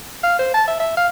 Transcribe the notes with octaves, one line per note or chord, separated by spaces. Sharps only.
F5
C5
A5
E5
E5
F5